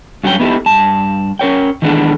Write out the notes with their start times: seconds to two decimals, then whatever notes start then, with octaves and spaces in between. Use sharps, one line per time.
0.24 G2 F#3 C#4 G4 G5
0.40 B3 D#4 E4 G4 A4
0.66 G2 A5
1.39 C#4 A#4 C#5 G5
1.82 D#3 E3 G#3 B3 D4 A4